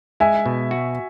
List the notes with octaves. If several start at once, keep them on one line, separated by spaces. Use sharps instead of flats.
G#3 E5 G#5
B2
F#4